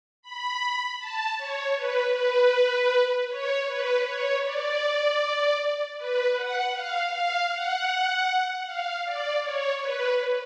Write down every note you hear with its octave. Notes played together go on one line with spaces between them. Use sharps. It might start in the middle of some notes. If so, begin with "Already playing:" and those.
B5
A5
C#5
B4
B4
C#5
B4
C#5
D5
B4
F#5
F5
F5
F#5
F5
D5
C#5
B4